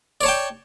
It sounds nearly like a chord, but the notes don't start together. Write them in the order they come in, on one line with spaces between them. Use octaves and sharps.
D5 C#5 A5 G5